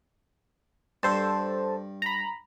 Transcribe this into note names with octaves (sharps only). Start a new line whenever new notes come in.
G2 A4 C5 A5
A#5 B5